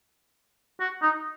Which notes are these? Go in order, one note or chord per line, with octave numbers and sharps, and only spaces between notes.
F#4
D#4